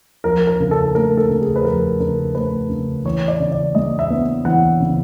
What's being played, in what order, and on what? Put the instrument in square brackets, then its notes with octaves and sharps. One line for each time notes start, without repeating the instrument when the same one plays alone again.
[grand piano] F3 A#4
A#4
C#3
A4
A3 A#4
A4
C#3
G#4
B4
F3 A#4
C#3 A#4
A3 B4
C#3
E3 C#5
D5
C#3
D5
G#3 D#5
E5
B3
E3 F#5
C#3